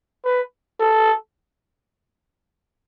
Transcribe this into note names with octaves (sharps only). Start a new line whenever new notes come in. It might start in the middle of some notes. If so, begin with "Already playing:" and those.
B4
A4